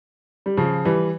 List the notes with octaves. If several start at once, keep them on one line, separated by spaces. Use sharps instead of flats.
G3
C#3 F3
E3 G3